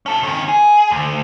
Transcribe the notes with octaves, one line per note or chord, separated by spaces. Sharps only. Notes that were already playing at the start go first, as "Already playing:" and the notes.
C#4 A4
D#3 C#4
G#4
D2